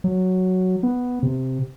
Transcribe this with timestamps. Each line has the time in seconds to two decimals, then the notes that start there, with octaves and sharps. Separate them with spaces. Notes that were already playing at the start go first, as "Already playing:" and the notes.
0.04 F#3
0.83 B3
1.23 C3